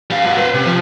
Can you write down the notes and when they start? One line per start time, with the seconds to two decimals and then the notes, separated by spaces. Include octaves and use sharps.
0.10 G3 F5
0.24 G2 F#4
0.37 B4 C5
0.54 C3
0.66 F3